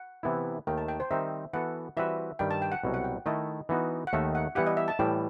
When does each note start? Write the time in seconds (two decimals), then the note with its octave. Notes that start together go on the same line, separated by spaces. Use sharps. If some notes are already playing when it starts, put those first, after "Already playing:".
Already playing: F#5
0.23 C3 E3 B3 E4
0.67 D#2 D#3 A3 G5
0.78 A5
0.88 G5
1.00 C5
1.11 D#3 G3 C4 D#4 E5
1.53 E3 B3 F#4 A4 F#5
1.97 E3 G3 C4 F#4 B4 E5
2.39 G2 D#3 G3 G5
2.51 A5
2.62 G5
2.72 F#5
2.84 C2 B2 F#3
2.94 F#5
3.04 G5
3.26 D#3 A3 E4 A4 D#5
3.69 E3 B3 D#4 F#4
4.07 F#5
4.13 D#2 D#3 A3 D#4 E5
4.35 F#5
4.55 E3 G3 B3 E4 G4 F#5
4.67 D#5
4.77 E5
4.88 A5
4.99 A2 E3 G3 G5